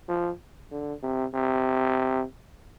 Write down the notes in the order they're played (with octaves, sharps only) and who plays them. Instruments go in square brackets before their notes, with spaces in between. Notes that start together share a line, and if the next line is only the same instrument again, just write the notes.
[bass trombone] F3
D3
C3
C3